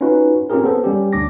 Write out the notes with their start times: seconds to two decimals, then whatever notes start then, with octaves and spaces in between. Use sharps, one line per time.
0.01 C#4 D#4 F4 F#4 B4
0.50 C4 C#4 F4 G4 G#4 A#4
0.64 B3 A4 C5
0.84 G3 C#4 G4
1.13 D2 D4 D6 A#6